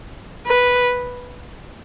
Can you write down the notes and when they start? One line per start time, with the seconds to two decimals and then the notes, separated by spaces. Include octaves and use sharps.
0.47 B4